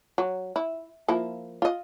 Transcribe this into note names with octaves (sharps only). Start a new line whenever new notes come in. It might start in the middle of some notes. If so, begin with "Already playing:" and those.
F#3
E4
F3 A#3 E4
F4 D#5